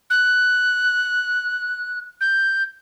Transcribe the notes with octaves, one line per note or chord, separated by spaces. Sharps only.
F#6
G6